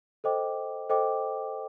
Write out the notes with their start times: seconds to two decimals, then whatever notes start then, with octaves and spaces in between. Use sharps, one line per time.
0.24 A4 C5 D#5 G5 D6
0.90 A4 C5 D#5 G5 D6